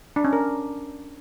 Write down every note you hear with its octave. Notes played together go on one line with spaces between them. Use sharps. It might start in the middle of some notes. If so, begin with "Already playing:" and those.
D4
C#4
A#4